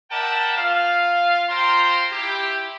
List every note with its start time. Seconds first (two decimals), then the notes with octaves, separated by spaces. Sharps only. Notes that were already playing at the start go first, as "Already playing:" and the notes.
0.11 A#4 D5 E5 F#5 G5 A5
0.57 F4 F5
1.50 F4 C5 G5 A#5 C6
2.12 E4 G4